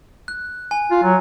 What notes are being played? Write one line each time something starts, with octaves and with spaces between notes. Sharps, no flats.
F#6
G#5
F4
F#3